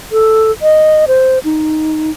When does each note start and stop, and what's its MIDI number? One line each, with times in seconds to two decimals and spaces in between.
0.12 0.52 69
0.62 1.05 75
1.08 1.39 72
1.44 2.11 63